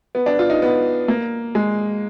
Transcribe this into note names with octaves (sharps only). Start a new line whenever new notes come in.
B3
D4
F4
D#4
B3
A#3
G#3